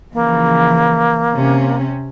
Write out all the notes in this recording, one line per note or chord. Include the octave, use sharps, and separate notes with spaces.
C#3 E3 F3 A#3
C3 C#4